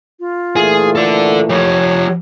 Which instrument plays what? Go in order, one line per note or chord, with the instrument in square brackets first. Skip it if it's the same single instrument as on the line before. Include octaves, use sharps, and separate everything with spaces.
[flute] F4
[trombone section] A#2 E3 A3 [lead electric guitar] G#4
[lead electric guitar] A4 D5
[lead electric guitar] F3 G4 [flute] C#5